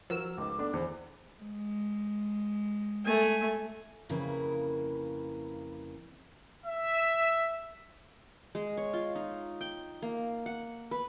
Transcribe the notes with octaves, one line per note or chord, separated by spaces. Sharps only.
F3 F#3 A#4 E6 E7
C#2 D#3 D6
A3 B3 D4
E2 C5
G#3
A3 G#5
F2 C#3 A#3 E4 A#4 B4
E5
G#3
C#5
F4
D#4
G5
A#3
F#5
B4